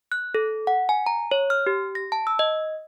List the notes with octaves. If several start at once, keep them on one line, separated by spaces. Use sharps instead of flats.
F#6
A4
F#5
G#5
A#5
C#5
F6
G4
A#6
A5
E6
D#5